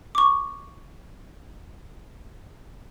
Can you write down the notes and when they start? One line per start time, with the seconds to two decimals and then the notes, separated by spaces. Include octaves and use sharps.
0.15 C#6 D6